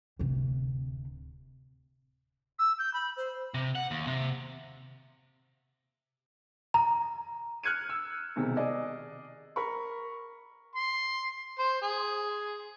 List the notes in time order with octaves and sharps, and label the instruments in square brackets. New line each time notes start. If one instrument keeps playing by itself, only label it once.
[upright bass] D1 C3
[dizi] E6
G6
B5
C5
[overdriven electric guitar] C3
F#5
D#2
C3
[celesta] A#5
[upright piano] F6 F#6 G#6 C#7 D#7
E6
E1 B1 C3 D#3
G#4 D5 D#5
A#4 B5 C#6
[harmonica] C6
C5
G#4